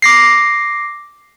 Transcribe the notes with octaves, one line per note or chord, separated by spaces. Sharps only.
D6 A#6 C7